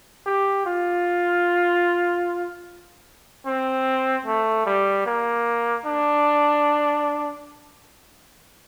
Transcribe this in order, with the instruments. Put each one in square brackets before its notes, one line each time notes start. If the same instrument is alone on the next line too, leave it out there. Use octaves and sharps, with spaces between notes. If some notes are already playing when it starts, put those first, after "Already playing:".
[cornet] G4
F4
C4
A3
G3
A#3
D4